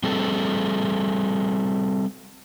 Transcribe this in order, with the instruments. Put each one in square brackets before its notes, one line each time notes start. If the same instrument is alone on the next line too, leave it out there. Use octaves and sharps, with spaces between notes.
[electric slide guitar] G3 C4 G#4 A4